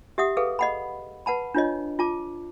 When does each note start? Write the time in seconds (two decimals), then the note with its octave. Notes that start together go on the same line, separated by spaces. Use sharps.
0.18 G4 E5 F#5 D#6
0.37 G#4 A4 B4 F5
0.59 D#5 F#5 B5
1.26 B4 F#5 A5 B5
1.54 D4 F4 C#5 D#5
1.99 F4 A5 D6